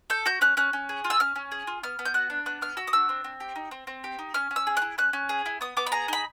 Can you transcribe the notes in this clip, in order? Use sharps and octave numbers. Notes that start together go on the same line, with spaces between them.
A4 G6
F#4 G6
C#4 F#6
C#4 F#6
C#4
G#4
F4
E6
C#4 F6
C#4
G#4
F4
B3 F6
B3
G6
F#4 F#6
D4
B3 F#6
B3 F6
F#4 E6
D#6
D4 E6
C4
C4
G4
D#4
C4
C4
G4
D#4
C#4 F6
C#4
E6
G#4
E4 F#6
C#4 F#6
C#4
G#4
E4
B3 D#6
B3 D6
B5
G#4 A#5
D#4 B5